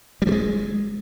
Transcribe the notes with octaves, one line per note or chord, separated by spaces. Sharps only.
G3
F3
G#3